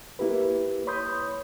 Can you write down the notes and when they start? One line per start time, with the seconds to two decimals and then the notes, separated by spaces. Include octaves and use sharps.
0.19 A#3 E4 G4 B4
0.87 C#5 B5 C6 D#6 G6